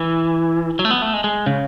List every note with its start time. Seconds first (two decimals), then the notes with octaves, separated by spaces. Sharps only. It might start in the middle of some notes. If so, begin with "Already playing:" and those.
Already playing: E3
0.79 F#3
0.85 A3
0.90 B3
1.02 A3
1.14 G#3
1.24 G#3
1.46 C#3